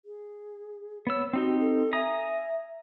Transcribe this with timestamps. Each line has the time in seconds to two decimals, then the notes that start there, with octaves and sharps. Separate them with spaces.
0.05 G#4
1.07 B3 C#5 E6
1.33 C4 D#4 F#4 G4
1.60 A4
1.93 E5 G#5 A#5 D#6